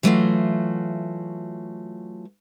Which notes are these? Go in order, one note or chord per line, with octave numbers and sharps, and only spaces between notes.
E3 F#3 A3 B3 F4 F#4